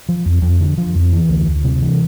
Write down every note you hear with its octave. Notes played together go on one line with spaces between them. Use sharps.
F3
F2
F2
D3
F3
F2
E3
D2
D2
C3
E3